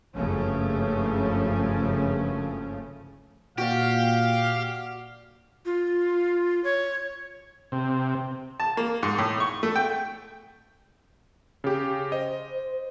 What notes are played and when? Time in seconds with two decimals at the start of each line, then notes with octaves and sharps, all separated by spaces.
0.15 F#1 G2 C#3 F3 A3 C#4
3.58 A#2 F#4 G4 D5 F5
5.66 F4
6.64 C#5
7.72 C3
8.60 A5
8.77 A#3
9.03 G#2
9.18 A2
9.40 C#6
9.63 A3
9.76 G5
11.64 C#3 G4
12.12 C5 D#5